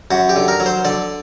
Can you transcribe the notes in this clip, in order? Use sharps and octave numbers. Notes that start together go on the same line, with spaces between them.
F#2 F#4
G4
D3
A#4
F#3
C5
D3 D5